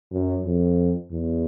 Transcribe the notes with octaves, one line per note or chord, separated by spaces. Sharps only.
F#2
F2
E2